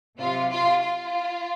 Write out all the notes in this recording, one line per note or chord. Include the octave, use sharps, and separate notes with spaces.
C3 F#3 F4
F4
F4